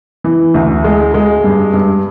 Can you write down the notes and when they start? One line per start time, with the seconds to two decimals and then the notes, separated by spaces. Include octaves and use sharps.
0.24 E3
0.54 D2
0.84 G#3
1.14 G#3
1.44 G2
1.73 G2